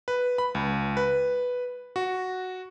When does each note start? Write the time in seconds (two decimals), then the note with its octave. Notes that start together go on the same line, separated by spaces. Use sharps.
0.08 B4
0.38 B5
0.55 C#2
0.97 B4
1.96 F#4